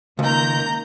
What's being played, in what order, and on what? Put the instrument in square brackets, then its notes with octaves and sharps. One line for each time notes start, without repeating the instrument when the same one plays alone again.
[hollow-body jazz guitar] C#2 [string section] D#3 A#5 [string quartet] A#3 A#4 G6